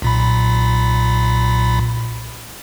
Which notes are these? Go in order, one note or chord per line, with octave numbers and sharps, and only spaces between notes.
B1 A#2 B5